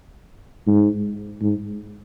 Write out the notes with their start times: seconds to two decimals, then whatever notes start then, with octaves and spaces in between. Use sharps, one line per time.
0.67 G#2
1.41 G#2